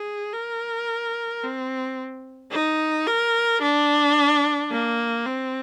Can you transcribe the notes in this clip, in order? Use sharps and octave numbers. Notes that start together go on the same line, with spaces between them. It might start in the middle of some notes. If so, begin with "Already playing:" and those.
Already playing: G#4
A#4
C4
D#4
A#4
D4
A#3
C4